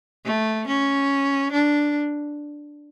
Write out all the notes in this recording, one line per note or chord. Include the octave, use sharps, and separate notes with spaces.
A3
C#4
D4